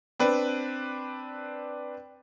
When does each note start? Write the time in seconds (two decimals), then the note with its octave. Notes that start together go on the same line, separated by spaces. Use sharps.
0.19 C4 D4 B4